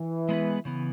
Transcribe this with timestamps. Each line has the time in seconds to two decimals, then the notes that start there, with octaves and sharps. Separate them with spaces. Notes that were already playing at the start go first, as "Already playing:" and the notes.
Already playing: E3
0.29 G#3 B3 G#4 B4
0.65 C#3 E3 B3